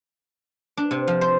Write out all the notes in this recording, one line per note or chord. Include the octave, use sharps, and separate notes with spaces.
D4
C3
F3
C5